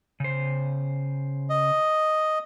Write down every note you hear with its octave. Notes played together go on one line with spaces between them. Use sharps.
C#3 C5
D#5